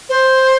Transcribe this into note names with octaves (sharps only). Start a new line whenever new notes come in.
C5